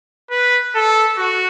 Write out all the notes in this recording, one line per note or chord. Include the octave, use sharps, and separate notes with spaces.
B4
A4
F#4